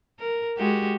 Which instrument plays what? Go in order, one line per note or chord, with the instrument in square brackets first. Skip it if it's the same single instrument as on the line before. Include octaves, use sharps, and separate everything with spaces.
[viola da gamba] A#4
G#3 F#4 G4